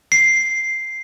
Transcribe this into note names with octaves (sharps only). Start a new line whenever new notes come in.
C7